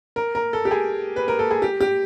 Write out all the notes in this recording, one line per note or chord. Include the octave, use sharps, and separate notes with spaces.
A#4
A#4
A4
G4
G#4
B4
A#4
A4
G#4
G4
G4